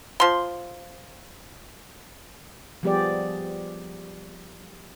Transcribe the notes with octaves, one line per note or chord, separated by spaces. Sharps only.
F3 C6
F3 G3 B3 G4 G#4 D5